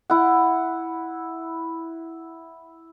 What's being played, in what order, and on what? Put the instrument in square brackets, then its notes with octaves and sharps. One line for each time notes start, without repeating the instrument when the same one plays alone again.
[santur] E4 F#5